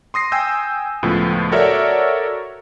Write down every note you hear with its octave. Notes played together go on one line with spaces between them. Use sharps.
C6 D#6 A#6 C7
G5 G#5 D#6 E6 G6
C#2 A2 F3 B3
F#4 A4 A#4 C#5 D5 E5